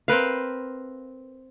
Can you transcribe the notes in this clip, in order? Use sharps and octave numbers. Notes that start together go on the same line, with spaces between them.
C4 A#4 B4 F5